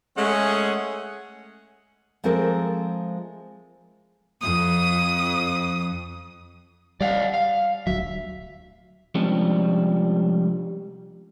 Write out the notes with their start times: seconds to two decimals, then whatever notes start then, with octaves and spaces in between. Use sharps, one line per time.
0.17 G#3 A3 C#4 G#4 F#5
2.24 F3 G#3 A3 C4 A4 A#4
4.41 F2 D#6
7.01 G3 D5 F5 F#5
7.34 F5
7.87 D1 D2 F#3 E5
9.15 C3 F3 G3 G#3 C#4 D4